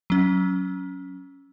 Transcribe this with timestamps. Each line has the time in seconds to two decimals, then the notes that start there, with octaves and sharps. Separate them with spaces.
0.10 F#3 C#4